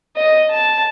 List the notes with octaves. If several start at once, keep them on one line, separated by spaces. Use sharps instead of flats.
D#5
A5